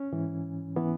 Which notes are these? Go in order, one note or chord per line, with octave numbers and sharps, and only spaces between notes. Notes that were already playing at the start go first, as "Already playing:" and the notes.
Already playing: C#4
G#2 E3
E3 B3